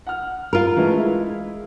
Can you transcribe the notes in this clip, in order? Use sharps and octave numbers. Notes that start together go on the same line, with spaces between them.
F#5 F6
F4 A#4
E3 G#3 A3
G#3 E4